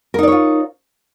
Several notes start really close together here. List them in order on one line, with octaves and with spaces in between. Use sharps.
A#4 D#4 D5 C#5 F4